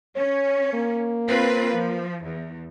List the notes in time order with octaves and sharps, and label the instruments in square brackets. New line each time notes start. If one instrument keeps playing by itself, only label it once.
[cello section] C#4 [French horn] C#5
[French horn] A#3
[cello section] C4 F4 B4
F3
E2